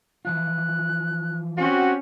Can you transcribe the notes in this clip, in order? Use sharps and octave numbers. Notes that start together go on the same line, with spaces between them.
E3 F3 F4 F#6
C4 C#4 F#4 G4